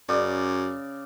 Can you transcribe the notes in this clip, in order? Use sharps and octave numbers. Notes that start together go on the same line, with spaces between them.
F#2 C#3 D5